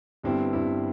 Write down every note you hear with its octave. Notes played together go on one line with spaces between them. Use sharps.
G1 G2 G3 C4 E4
G1 G2 G3 C4 E4